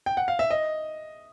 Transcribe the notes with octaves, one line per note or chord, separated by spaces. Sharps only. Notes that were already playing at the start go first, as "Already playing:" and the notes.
G5
F#5
F5
E5
D#5